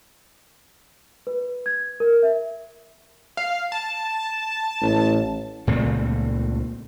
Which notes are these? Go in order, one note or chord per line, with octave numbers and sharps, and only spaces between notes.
B4
G#6
A#4
E5
F5
A5
A1
C#2 A#2 A3 C4